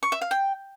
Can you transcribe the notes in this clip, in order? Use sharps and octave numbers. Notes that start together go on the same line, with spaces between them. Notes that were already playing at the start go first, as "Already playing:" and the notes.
C#6
E5
F5
G5